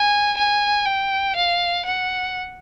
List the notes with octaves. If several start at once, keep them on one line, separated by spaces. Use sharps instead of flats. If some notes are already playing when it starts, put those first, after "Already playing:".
Already playing: G#5
G#5
G5
F5
F#5